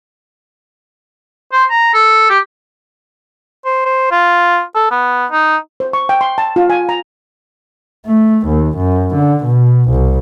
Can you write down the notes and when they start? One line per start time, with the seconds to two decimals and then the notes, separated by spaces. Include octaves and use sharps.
1.52 C5
1.70 A#5
1.94 A4
2.30 G4
3.65 C5
3.86 C5
4.12 F4
4.75 A4
4.91 B3
5.32 D#4
5.80 C5
5.93 C#6
6.09 G5
6.21 C6
6.38 A5
6.56 F4
6.70 G#5
6.89 A#5
8.07 A3
8.48 D#2
8.78 F#2
9.16 D3
9.45 B2
9.90 C2